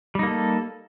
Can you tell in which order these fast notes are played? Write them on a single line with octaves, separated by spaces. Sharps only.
G3 D#4 A#3 A4